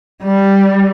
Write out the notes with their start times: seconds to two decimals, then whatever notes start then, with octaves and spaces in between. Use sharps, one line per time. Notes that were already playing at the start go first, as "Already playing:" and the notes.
0.23 G3